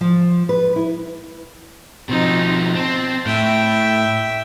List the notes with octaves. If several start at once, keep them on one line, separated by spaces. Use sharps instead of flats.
F3
B4
E4
B2 F3 C4 D#4
C4 C5 A5
A2 E5 G5